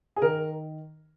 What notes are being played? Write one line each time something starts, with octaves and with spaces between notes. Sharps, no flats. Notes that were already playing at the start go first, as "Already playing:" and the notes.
G#4
D#3 A#4